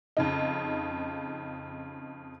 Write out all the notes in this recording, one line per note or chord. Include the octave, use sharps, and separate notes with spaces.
F2 C#3 D#4